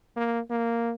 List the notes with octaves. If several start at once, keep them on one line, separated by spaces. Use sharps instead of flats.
A#3
A#3